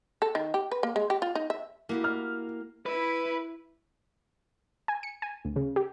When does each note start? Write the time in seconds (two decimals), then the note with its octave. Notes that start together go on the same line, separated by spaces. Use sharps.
0.22 A4
0.35 D#3
0.54 G4
0.71 B4
0.83 A#3
0.96 G#3
1.10 G4
1.22 F4
1.35 D#4
1.50 E5
1.89 A#3 E4 F#4 G4
2.04 F6
2.86 E4 B4
4.88 G#5
5.03 C#7
5.22 G#5
5.45 D2
5.56 C#3
5.76 G4